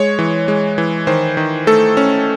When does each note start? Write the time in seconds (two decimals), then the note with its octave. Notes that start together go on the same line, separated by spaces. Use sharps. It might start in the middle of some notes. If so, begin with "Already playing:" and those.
Already playing: G#3 C#5
0.19 E3
0.48 G#3
0.78 E3
1.07 D#3 C5
1.37 D#3
1.67 A3 A4
1.97 C#4